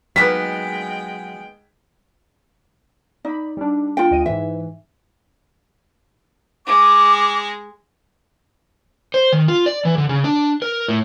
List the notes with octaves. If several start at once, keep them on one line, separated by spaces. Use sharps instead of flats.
D#3 F#3 G#3 A#3 B3 G5 B6
D#4 D5 B5
G3 D4
F4 G5
D2 D#5 D#7
G#2 E3 E5
G#3 D6
C5
D#3
F4
D5
E3
D3
C#3
D4
A#4
A2